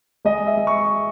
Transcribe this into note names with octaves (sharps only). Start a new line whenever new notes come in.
G#3 D#5
E5
G#3
C#6